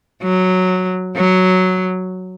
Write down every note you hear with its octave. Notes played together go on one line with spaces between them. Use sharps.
F#3
F#3